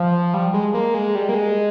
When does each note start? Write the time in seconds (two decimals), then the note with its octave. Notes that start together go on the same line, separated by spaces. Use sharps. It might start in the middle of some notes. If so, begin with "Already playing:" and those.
Already playing: F3
0.34 G3
0.54 G#3
0.74 A#3
0.94 G#3
1.15 G3
1.29 A#3
1.35 G#3